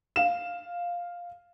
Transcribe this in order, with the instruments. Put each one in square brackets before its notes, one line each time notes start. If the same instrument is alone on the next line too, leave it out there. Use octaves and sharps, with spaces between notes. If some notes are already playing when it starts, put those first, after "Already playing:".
[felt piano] F5 E7